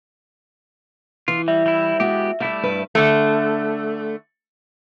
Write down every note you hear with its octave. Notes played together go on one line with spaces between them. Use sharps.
E3 F4
G3 E5
G3 E4
G#3 B3 F#4 G4
G3 A3 E4 D5 F5
G2 B4 E5
D3 A3